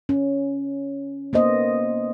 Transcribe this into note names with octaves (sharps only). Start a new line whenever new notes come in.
C#4
A#3 B3 C5 D#5